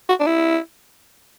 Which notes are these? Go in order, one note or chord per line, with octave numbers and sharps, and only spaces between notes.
F#4
D4
E4